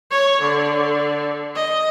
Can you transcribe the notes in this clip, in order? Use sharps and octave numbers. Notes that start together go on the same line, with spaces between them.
C#5
D3
D#5